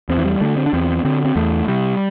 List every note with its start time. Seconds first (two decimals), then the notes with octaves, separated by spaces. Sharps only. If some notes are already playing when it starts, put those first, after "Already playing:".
0.09 E2 C4
0.18 E3
0.25 G3
0.41 D3 A3
0.57 C4
0.66 D4
0.73 E2 C4
1.05 D3 C4
1.25 C4
1.36 E2 A3
1.68 C3 G3